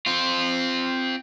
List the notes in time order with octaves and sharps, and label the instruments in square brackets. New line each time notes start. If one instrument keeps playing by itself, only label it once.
[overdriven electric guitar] C4 F4